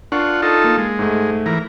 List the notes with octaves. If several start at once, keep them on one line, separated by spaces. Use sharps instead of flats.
D4 F4 A#4 F#5 C#6
D#4 F4 A4
A#3 A#4
G#3
G#2 A3
E3 A#4